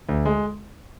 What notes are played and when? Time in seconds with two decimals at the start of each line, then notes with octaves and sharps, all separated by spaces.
0.09 D2
0.26 G#3